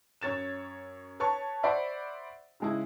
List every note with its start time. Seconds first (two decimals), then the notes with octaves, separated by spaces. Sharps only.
0.21 F#2 C#5 A6 E7
1.20 B4 C#5 A5 C#6
1.63 C5 D5 E5 F#5 B5 C#6
2.60 C#3 G#3 E4